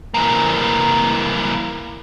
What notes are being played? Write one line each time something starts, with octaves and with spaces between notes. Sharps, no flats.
E3 A#3